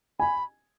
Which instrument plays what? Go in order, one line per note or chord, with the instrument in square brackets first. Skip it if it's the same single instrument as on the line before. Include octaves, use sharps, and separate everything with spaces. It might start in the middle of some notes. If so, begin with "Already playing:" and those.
[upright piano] G#5 [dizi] B5